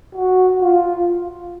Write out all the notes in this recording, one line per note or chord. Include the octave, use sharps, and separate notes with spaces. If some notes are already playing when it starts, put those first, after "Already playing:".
F#4
F4